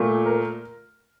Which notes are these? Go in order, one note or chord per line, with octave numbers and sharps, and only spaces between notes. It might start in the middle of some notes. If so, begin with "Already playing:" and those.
Already playing: A#2 A3
A#4